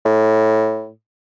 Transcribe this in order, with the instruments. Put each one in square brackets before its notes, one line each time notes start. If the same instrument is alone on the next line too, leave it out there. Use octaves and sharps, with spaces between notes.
[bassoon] A2